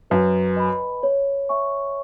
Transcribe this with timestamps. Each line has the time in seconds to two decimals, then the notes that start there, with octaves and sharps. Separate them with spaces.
0.10 F#2 B4
0.56 D#5 G#5 B5
1.03 C#5
1.49 E5 G#5 C#6